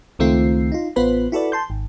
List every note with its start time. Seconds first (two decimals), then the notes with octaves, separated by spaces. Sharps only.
0.19 C#2 D#3 A3 C4 F4 C7
0.72 D#4 F4
0.96 A1 B3 F4 B4 C5 B5
1.32 E4 F#4 A4 B4 D5
1.52 A5 C6 G6
1.70 G#1